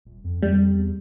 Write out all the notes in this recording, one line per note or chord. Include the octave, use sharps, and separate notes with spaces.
D#1
F2
F2 G3
E2